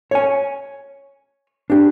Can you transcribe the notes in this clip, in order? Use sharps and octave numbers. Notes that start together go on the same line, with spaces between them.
C#5 G#5
D4 G4